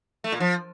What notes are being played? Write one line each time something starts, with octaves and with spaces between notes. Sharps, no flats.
A3
A#2
F3